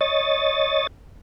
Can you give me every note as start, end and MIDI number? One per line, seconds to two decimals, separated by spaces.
0.01 0.87 73
0.01 0.87 75
0.01 0.87 93